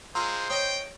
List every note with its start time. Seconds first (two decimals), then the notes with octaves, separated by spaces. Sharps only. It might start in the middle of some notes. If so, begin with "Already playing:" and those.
0.15 G#3 F4 C5 A#5 C6 E6
0.50 C#5 D#5 G5 D#6